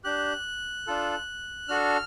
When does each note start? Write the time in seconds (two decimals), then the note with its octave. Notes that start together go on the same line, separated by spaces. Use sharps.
0.04 D4 G4 F#6
0.87 D4 F4 A4
1.68 D4 F#4 A4 F6